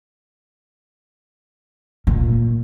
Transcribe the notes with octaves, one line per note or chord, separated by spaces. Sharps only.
A#2